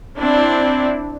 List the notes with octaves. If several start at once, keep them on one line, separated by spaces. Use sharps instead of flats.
C4 D4 E4